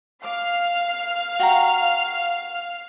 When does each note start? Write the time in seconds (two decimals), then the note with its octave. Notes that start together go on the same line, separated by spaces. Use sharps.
0.24 F5 D6 F6 C7
1.39 F#4 G5 A#5